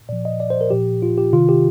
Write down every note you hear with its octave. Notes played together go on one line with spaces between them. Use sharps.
A#2 F3 D5
D#5
D5
C5
A#4
A#2 F3 G4
F4
G4
C3 D#3 F4
G4